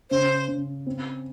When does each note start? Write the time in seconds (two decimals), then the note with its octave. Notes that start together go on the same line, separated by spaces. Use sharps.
0.11 C#3 C5
0.48 C#3
0.86 C4